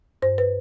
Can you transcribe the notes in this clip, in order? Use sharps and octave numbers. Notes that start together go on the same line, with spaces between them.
G2 C5
B4